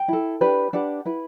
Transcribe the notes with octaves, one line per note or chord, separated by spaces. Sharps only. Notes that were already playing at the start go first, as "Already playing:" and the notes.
Already playing: G5
E4 A4
D4 G4 B4
D4 G4 B4 F#5
E4 B4